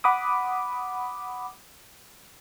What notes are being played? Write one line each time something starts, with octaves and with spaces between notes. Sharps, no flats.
F#5 B5 D6 D#6